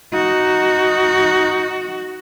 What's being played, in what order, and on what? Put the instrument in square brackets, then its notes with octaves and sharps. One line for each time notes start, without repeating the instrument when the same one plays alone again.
[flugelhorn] D#4 [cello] F#4